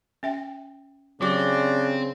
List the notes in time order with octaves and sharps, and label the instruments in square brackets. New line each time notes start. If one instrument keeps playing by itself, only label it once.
[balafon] C#4 E5 G5
[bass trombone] C#3 [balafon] F#3 F#4 D6 [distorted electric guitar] C4 [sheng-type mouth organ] D4 G4 D5